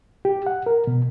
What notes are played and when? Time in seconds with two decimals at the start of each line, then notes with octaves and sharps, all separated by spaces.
0.25 G4
0.46 F#5
0.66 A#4
0.87 B2